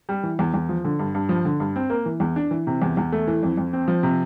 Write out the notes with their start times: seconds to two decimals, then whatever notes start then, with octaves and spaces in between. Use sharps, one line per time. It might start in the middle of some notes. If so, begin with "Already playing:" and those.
0.09 G3
0.23 E3
0.39 E2
0.54 E2
0.69 F3
0.85 D3
0.99 G2
1.15 G2
1.29 F3
1.45 D3
1.60 G2
1.76 C4
1.90 A#3
2.06 E3
2.20 E2
2.36 D4
2.51 E3
2.67 C3
2.82 E2
2.97 E2
3.12 A3
3.27 E3
3.43 F2
3.57 F2
3.73 C4
3.88 F3
4.03 C3